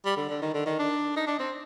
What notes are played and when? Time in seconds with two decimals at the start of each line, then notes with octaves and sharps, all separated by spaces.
0.05 G3
0.17 D3
0.29 D3
0.42 D#3
0.54 D3
0.66 D#3
0.79 D4
1.16 D#4
1.27 D4
1.39 C4